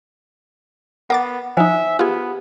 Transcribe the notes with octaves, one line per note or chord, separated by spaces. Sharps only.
B3 A#4 F#5 D6 A6
F3 D#4 C5 E5 G#5
B3 F4 G4 G#4